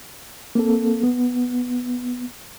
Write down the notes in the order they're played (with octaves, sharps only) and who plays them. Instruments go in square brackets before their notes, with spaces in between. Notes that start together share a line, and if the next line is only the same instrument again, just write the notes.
[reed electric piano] A#3 C4 A4
B3